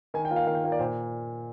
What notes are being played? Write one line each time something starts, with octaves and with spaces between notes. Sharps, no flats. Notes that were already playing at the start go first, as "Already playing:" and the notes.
D#3 G#5
G5
A#3 F4
F5
D#3 F5
G5
A#3 F4
D5
A#2 C5